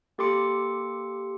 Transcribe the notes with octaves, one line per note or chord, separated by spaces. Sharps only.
A#3 G4 A4 C6 D6 C#7